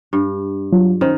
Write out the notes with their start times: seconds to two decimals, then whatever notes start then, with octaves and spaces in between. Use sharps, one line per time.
0.13 G2
0.72 F#3 F4
1.01 D#3 C#4 D#4 C5